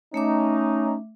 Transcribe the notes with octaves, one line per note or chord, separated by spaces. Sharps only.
A3 C#4 D#4 E5 D6